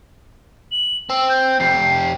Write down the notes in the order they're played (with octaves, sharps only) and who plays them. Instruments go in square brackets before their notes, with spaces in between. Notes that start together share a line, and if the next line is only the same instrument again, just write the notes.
[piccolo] F#7
[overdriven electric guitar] C4 [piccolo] E6
[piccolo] G6
[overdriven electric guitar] F2 G4 [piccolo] C7